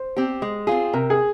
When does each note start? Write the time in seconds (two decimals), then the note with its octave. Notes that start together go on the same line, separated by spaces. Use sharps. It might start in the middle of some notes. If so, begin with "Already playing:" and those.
Already playing: C5
0.16 C4 G4
0.42 G#3
0.67 C4 F4 G#4
0.94 C3 A#4
1.10 G#4